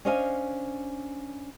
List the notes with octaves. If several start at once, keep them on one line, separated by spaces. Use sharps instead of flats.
C#4 D4 C5 D#5 F5 G#5